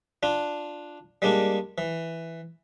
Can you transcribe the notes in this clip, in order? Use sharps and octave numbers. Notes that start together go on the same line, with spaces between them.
D4 F4
G3 G#3 A#3 D4
E3